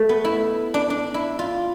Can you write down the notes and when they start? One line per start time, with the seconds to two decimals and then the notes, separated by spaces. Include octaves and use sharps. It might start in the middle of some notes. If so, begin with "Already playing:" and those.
Already playing: A3
0.09 B3
0.25 E4
0.74 D4
0.90 D4
1.14 E4
1.39 F4